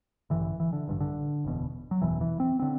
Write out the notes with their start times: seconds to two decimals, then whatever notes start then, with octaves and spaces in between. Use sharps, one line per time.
0.30 A1 G2 D3 E3
0.60 E3
0.73 D3
0.88 A1 G2 D3
1.01 D3
1.44 F#1 E2 B2
1.91 F#3
2.02 F#1 E2 B2 E3
2.21 E3
2.40 C4
2.60 D3 C4